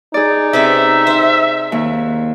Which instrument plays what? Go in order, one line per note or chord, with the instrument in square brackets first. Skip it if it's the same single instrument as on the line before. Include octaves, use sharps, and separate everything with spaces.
[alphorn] D#4 [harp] G#4 D5
[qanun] C3 C#4 B4 [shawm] E5
[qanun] C5 C6
[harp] D#2